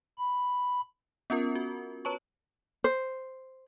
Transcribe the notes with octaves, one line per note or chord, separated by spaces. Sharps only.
B5
B3 C#4 F4 A#4
F#4
B4 C#5 A5 A#5 C#6
C5